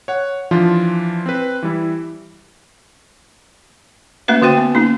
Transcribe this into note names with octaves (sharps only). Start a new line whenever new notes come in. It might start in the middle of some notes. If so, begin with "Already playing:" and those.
C#5 F#5
E3 F3 D4 F4
C4 B4
E3 G3 E4
A3 A#3 C#4 B4 E5
D3 F#4 C5 G5
B3
A#3 C#4 D#4